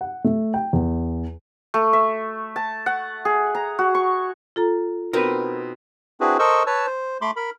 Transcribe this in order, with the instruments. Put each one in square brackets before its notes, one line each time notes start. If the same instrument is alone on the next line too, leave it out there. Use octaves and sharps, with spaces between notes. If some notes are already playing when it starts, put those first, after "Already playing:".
[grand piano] F#5
A3
G5
E2
[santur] A3
E5
A5
F#5
G#4
A#5
F#4
C#6
[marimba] F4 A4 A#5
[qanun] B2 C4 D#4 [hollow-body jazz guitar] A#4 B4
[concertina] C4 D4 E4 F#4 G#4 B4
A4 A#4 C5 D#5 C#6 E6
B4 C#5 A5 E6
C5
A3 B5 C6 D6
A#4 B5